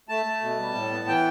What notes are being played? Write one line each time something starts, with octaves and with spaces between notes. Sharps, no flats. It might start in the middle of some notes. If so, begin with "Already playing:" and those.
A3 A5
A3
B2
G3
A2
B3
E3 G5